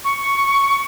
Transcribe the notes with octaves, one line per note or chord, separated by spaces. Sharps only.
C#6